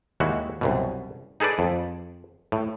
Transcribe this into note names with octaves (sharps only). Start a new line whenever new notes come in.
D#2 G3 G#3 E4 F#4
C2 F#2 B2
D#4 G#4 A4 B4 D5
F2
A2